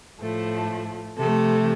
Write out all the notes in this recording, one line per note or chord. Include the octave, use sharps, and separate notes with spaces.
A2 F3 A3 A4
C3 F3 A3 A4